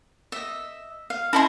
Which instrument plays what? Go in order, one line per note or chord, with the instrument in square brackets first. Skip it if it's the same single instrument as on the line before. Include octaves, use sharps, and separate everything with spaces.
[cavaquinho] D#5 E5
F5
[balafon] C#4 A5 [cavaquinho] E4 D#5 C6